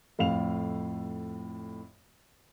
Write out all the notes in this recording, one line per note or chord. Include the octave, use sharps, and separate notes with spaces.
F2 A2 F5 F7